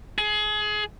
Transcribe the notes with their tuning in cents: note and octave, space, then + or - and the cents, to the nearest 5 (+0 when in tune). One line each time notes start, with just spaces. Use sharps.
G#4 +25